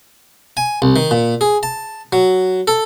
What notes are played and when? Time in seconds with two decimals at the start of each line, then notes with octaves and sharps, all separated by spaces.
0.57 G#5
0.82 C2
0.96 D#3
1.11 A#2
1.41 G#4
1.63 A5
2.13 F#3
2.68 A4